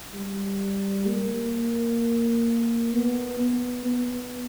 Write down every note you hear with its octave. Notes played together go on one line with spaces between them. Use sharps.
G3
A#3
B3
B3
B3